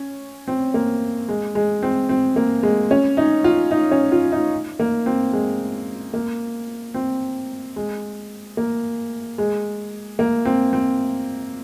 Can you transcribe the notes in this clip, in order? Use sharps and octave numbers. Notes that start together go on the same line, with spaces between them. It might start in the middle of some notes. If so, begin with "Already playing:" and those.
Already playing: C#4
C4
A#3
G#3
G#3
C4
C4
A#3
G#3
C#4
D#4
F4
D#4
C#4
F4
D#4
A#3
C4
G#3
A#3
C4
G#3
A#3
G#3
A#3
C4
C4